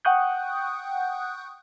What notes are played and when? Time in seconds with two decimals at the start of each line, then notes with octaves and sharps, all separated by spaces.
0.05 F#5 G5 C#6 D#6 F#6 G6